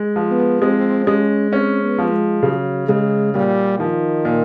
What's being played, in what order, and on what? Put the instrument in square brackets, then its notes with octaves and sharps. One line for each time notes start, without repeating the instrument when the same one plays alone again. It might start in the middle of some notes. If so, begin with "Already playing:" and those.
Already playing: [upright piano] G#3
F3
[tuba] B3
[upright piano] G#3 [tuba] C4
[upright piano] G#3 [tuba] C#4
[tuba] C4 [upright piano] C#4
[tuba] B3
[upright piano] F3
[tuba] G#3
[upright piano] C#3 [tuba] F#3
[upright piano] C#3 [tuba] G#3
[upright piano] A#2 [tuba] G3
[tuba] D#3 [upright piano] F3
[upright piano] A#2